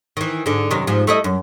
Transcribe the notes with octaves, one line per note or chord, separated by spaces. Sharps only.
D#3 E3
G#2 D3
F#2 C3 D#3
G#2 F3
A3 E4 D#5
F#2